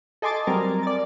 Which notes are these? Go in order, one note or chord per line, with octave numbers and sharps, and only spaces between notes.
A4 D#5 G#5 C6 D6 A6
F#3 G3 C4 A#4
D5 A6